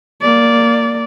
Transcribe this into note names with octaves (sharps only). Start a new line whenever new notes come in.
A#3 D5